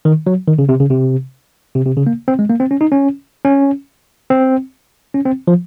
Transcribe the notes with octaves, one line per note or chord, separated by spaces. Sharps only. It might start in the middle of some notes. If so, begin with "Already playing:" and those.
D#3
F#3
D#3
C#3
C3
C#3
C3
C3
C3
C#3
A#3
C4
G#3
A#3
C4
C#4
D#4
C#4
C#4
C4
C#4
C4
F3